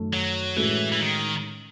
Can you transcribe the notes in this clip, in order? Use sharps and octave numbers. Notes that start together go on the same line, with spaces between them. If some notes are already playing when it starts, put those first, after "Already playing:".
Already playing: F#2 D#3 A3
F#3
A2 E3 G#3 C#4 F#4 A4
E3
D#3